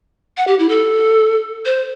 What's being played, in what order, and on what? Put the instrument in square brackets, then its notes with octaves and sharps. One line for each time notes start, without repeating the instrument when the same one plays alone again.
[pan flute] F#5
G4
E4
A4
C5